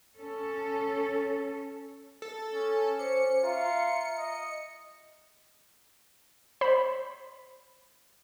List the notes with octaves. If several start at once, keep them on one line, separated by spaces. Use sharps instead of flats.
C#4 A4
A4
C#4
C#4 C5 D6 C#7
F4 E5 A#5
D#5
C5 B5